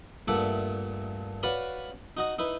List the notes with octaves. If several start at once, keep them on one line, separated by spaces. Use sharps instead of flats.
G2 A#2 A3 E5 F#5 D6
F#4 B4 C#5 D5 F5 B5
D#4 F#4 D#5
D#4 E4 B4